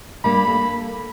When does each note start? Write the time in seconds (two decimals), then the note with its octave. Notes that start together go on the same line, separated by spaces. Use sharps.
0.24 G3 A#3 D4 B5
0.47 A#3 A4